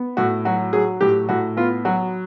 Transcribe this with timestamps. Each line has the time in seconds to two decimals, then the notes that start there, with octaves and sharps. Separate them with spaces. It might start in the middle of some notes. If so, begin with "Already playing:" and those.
Already playing: B3
0.17 A2 F#4
0.45 F#3 F#4
0.73 F#3 G#4
1.01 A2 G4
1.29 A2 F#4
1.57 B3 F4
1.85 F#3 F#4